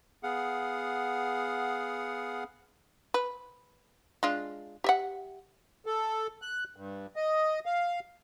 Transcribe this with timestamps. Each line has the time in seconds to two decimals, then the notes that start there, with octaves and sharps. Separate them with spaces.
0.23 B3 G#4 F5 F#5
3.14 B4
4.23 G#3 D4 F4
4.84 G4 E5 F#5
5.86 A4
6.42 F#6
6.76 G2
7.16 D#5
7.66 F5